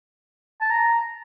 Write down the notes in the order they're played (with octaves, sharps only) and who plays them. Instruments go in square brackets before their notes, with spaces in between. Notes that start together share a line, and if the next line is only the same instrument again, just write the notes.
[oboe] A5
A#5